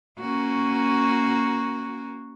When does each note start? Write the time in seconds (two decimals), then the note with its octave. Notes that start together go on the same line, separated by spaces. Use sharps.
0.20 A#3 C#4 F#4